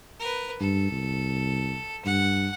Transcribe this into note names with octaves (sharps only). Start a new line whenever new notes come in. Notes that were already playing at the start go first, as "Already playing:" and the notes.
A#4 B4
G2 A4
C2
G2 F#5